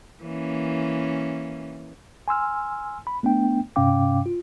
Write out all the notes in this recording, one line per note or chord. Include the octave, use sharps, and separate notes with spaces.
E3 A#3 C#4
G#5 C6 E6 F6
B5
A3 B3 D4 G5
G2 C3 C#4 F5 G5 D6
F4